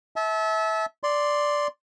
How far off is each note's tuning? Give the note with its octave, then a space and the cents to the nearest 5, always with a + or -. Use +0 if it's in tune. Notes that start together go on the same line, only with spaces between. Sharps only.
E5 -25 A5 -30
D5 +0 C6 +0